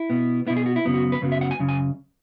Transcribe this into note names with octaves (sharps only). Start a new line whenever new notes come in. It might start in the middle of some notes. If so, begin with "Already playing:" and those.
Already playing: E4
B2 B3
B2 B3 E4
G#4
F#4
E4
F#2 C#3 F#3 B3
F#4
B4
F#2 C#3 F#3 B3
E5
F#5
G#5
F#2 C#3
G#5